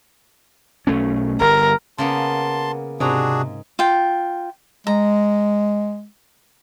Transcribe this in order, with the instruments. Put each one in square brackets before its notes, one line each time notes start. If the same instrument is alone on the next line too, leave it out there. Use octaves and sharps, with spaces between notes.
[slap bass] B1 A3 C#4
[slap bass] G1 [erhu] A#4
[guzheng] C#3 A#3 B3 [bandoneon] A5 C6
[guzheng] G#2 A#5 [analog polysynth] C3 [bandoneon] D4 F#4 G#4
[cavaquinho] F4 G5
[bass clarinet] G#3 [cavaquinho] A#5